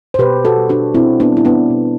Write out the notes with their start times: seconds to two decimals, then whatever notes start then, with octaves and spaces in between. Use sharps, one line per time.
0.14 C5
0.19 B2 G4 B4
0.45 F#4 A4
0.57 G3
0.69 D4 F#4
0.95 B2 C4 E4
1.20 B3 D4
1.32 G3 E4
1.45 B3 D4
1.70 B2